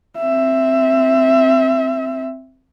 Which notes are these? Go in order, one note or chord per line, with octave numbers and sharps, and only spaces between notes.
C4 E5